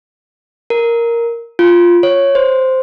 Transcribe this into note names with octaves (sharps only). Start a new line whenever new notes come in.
A#4
F4
C#5
C5